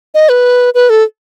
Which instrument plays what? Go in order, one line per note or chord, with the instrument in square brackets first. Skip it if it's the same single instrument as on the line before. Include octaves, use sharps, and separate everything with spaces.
[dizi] D#5
B4
B4
A4